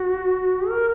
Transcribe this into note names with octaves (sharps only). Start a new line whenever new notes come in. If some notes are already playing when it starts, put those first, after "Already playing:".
Already playing: F#4
A#4